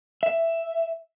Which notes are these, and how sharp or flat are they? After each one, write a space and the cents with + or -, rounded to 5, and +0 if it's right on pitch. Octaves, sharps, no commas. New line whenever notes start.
E5 +5